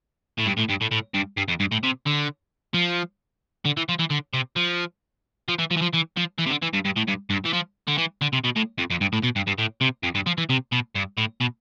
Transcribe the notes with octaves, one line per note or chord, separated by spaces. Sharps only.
A2
G2
A2
G2
A2
A2
G2
G2
F2
G2
A2
C3
D3
F3
D3
E3
F3
E3
D3
C3
F3
F3
E3
F3
E3
F3
E3
F3
E3
C3
D3
E3
G2
G2
A2
G2
G2
E3
F3
D3
E3
D3
C3
B2
A2
F2
F2
G2
A2
B2
G2
G2
A2
C3
F2
G2
F3
E3
C3
B2
G2
A2
B2